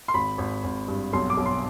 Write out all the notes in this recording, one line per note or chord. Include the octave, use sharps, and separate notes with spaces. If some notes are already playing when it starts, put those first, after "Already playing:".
C6
G#1 B5
G#1
G#1
G2
B1 C6
D6
B1
C6